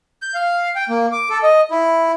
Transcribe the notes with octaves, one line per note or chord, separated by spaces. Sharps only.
G6
F5
G5
A#3
D6
A4
D#5
E4